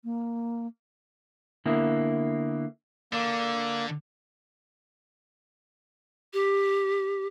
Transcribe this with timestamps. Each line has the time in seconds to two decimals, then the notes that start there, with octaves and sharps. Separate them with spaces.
0.04 A#3
1.65 D3 A#3 B3 E4
3.13 D3 A#3
6.33 G4